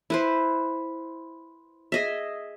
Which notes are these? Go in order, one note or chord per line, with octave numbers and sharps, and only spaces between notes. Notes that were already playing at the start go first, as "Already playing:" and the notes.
E4 B4 C5
G#4 D#5 E5